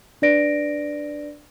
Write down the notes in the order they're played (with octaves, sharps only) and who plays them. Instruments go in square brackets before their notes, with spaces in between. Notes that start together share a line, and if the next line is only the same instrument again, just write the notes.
[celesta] D4 B4 D5 A#6 D7